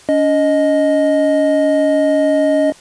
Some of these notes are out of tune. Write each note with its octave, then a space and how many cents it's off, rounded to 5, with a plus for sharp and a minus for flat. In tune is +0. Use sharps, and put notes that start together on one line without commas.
C#4 +45 D#5 +0